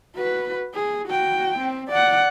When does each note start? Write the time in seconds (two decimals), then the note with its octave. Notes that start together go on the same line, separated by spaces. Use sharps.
0.16 F#4 B4
0.74 G#4
1.08 F#4 G5
1.59 C4
1.89 D5 F#5